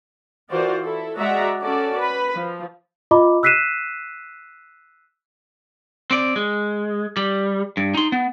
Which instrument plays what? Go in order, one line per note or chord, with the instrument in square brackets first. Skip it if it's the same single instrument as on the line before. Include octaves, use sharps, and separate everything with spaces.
[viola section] E3 F4 F#4 A#4 C5 D5
E4 A4
G#3 F#4 D5 E5 F#5 A#5
C#4 F#4 A4 D5
B4 B5
F3
[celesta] F4 D#5 A#5 B5 D6
E6 F#6 B6 C7 D#7 E7
[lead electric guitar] C4 D5
G#3
G3
G2
D#4 C6
B3